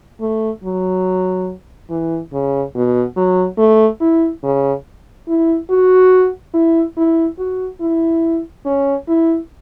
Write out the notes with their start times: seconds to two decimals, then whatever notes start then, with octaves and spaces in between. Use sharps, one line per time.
0.21 A3
0.64 F#3
1.90 E3
2.33 C#3
2.75 B2
3.16 F#3
3.58 A3
4.01 E4
4.43 C#3
5.28 E4
5.70 F#4
6.54 E4
6.97 E4
7.39 F#4
7.80 E4
8.66 C#4
9.08 E4